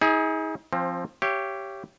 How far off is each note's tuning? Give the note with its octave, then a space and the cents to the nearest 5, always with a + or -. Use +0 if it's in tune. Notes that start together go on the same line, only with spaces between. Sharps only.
D#4 +40 G#4 +0
F3 +0 C4 +25
G4 -5 C#5 +0 E5 +45